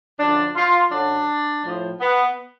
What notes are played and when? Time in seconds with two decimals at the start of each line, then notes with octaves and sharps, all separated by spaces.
0.19 F#2 D3 F3 D4
0.56 F4
0.91 F#2 D3 F#3 D4
1.64 A2 F3
2.00 B3